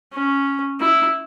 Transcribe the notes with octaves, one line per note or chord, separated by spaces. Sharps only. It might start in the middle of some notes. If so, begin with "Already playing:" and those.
C#4
E4